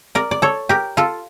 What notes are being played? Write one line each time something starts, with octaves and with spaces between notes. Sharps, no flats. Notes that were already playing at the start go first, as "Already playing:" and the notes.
A#4 D5
D5
A4 C#5
G4 A#4
F4 A4